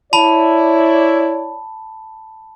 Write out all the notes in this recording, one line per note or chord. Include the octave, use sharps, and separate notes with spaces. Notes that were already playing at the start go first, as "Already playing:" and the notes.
E4 C#5 D5 A5 B5